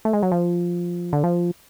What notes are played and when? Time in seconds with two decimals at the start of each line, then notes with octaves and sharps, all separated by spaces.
0.05 A3
0.13 G#3
0.23 F#3
0.32 F3
1.13 D3
1.24 F3